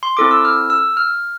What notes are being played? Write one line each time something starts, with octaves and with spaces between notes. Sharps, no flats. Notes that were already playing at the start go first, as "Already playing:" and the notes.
C6
C4 E4 A4 D6
E6
F6
E6
F6